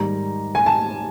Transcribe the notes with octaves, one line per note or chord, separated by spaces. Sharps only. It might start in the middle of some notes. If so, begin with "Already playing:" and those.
Already playing: G#2 D#3 G3 A#5
G#5
A5